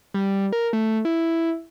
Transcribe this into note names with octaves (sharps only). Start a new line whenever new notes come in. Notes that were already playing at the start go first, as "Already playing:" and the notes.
G3
A#4
A3
E4